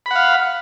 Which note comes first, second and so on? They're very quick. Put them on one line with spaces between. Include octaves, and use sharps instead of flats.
B5 F#5 F5